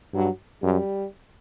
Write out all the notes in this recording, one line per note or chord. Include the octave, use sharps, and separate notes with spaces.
G2 F#3
F#2 G3